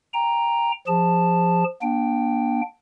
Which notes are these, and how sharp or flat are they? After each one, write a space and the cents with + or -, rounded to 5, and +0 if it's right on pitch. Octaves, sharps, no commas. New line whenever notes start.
G5 +20 A#5 +0
F3 +0 G#4 -30 A5 +0
A#3 +45 D4 +0 G5 +0